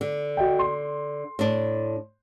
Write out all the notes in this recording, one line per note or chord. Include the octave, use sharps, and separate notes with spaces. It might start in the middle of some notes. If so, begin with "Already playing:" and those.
D3
F#4 D#5 G5
C6
A2 D4